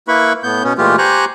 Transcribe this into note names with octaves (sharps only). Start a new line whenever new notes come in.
A#3 E4 B4 B5 C#6
A2 B3 G6
B2 B3 C#4
A#2 E3 G#3 A3 F4 G4
G4 C5 G#5 A#5 C#6 F#6